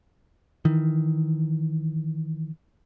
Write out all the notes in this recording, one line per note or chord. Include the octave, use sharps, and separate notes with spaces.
D#3 E3